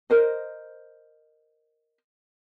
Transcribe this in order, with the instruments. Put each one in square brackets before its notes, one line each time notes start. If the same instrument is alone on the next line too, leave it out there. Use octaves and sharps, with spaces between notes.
[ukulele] A#4 C5 D#5